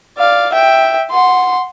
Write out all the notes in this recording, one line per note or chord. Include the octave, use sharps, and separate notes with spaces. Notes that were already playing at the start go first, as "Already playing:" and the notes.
D5 F5
E5 G5
F#5 C6